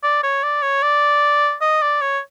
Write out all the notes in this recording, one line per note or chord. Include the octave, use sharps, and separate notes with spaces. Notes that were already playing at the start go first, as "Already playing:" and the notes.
D5
C#5
D5
C#5
D5
D#5
D5
C#5